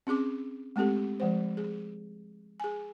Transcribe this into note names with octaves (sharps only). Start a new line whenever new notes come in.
C4 C#4 G#4 D6
G#3 A3 C4 G4 A4
F3 G#3 C5
G#4
G#4 G#5